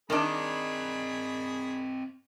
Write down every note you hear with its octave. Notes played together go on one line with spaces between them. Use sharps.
D#3 C4 D4 G#4 D#5 B5